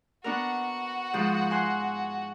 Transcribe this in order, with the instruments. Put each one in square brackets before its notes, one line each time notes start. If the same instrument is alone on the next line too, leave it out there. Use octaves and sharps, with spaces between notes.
[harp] B3 D4 A#4 [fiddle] F#4 F#5
[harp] G#2 F3
G#5 C6 F#6